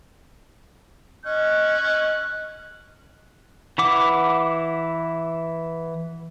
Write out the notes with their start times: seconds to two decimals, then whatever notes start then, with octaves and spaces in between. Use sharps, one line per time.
1.26 C#4 D#5 F#6
3.78 E3 E4 F#5 D6